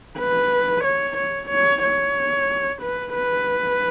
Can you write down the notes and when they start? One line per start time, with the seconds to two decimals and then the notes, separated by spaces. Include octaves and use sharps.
0.19 B4
0.84 C#5
1.17 C#5
1.50 C#5
1.83 C#5
2.82 B4
3.15 B4